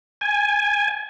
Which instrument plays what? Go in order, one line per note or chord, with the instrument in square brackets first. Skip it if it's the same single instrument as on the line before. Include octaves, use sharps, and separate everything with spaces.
[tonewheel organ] G#5